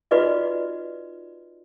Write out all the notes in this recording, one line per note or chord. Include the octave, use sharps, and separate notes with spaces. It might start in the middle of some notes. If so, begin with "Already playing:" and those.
D#4 F4 F#4 B4 D5 D#5